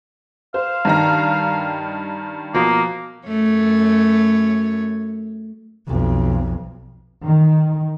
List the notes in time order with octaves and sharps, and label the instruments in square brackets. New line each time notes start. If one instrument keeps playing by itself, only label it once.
[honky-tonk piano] C5 [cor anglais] F5
[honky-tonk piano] G2 D#3 A#5
[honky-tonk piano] B2 F3 [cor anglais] A#3
[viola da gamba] F#2 A3 C#5
[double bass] B1 F2
[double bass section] D#3